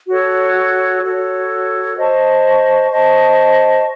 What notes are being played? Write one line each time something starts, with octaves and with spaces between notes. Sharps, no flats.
F#4 A4 C#5
F#4 A4 C#5
C5 D#5 A5 C#6
C5 D#5 A5 C#6